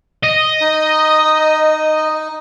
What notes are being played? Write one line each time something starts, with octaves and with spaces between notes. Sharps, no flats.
D#5
D#4